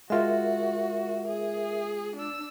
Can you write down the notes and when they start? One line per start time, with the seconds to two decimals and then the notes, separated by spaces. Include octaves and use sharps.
0.10 G#3 F4 F#4 A#4 E5
1.28 G#4
2.16 D4 E6